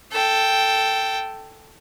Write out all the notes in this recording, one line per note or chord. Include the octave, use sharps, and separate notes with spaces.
A4 G5